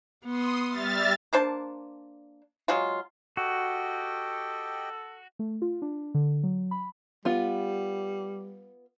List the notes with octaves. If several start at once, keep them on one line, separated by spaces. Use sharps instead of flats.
B3 C6 D#6
G3 E5 F6 A6
A#3 D4 C5 A5
F#3 G#3 F4
F#4 G4 A4 D#5 G5
A3
F4
D4
D3
F#3
B5
G3 B3 F4